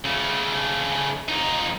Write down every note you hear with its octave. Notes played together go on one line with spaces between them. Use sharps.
C#3 A3
F2 D#4